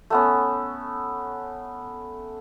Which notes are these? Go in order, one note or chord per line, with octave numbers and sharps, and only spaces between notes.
A3 B3 C#4